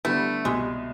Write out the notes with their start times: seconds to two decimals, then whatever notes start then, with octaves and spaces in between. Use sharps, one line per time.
0.05 D3 G3 A3 B3 E4
0.45 C2 B2 G3 G#3